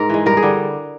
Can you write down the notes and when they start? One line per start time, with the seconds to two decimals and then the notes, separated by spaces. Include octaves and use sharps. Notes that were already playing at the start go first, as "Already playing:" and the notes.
Already playing: G#2 A#4
0.09 E3 G#3
0.26 G2 A#4
0.37 G#4
0.42 D3 G3